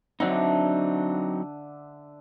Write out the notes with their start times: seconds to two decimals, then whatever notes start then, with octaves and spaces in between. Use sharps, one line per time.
0.20 D3 F#3 C4 D4 D#4 E5